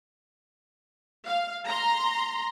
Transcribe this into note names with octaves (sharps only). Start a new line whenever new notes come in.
F5
A#5 C6